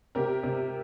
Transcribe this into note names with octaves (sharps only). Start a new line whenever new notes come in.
C3 G4 A#4
C3